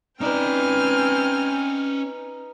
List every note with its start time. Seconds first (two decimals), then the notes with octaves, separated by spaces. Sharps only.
0.21 C4 C#4 D#4 B4 D5 G5 G#5 F6